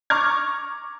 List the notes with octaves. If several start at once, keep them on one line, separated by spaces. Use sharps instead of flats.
A#5 C#6 D6 F6 G#6